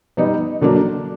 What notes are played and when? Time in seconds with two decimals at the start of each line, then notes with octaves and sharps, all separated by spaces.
0.17 G3 B3 D#4
0.61 D3 F#3 A#3 D4